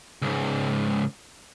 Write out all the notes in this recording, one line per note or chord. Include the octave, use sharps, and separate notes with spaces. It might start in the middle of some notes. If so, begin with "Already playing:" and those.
C#2 G#2